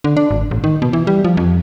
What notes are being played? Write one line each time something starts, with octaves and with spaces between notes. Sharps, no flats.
D3
D4
G#1
A1
D#3
B2
E3
G3
F3
F2